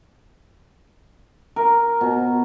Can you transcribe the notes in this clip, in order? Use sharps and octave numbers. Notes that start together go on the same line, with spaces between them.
A#4
B2